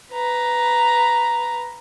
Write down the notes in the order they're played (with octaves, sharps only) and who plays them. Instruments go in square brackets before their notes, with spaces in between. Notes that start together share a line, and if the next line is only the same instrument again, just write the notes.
[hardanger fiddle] B4 A#5